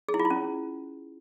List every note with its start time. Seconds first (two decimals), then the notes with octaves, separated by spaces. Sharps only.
0.09 G#4
0.14 E4
0.19 F4
0.25 E4
0.30 C#4